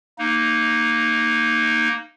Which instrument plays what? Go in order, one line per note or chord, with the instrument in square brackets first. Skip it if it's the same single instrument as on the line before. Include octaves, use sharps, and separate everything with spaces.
[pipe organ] A#3 D#4